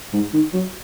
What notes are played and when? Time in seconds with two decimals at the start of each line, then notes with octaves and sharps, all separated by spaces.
0.13 G#2
0.33 D#3
0.53 F#3